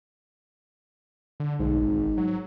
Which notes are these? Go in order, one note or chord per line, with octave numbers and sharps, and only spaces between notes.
D3
B1 G#2
G#1
F#3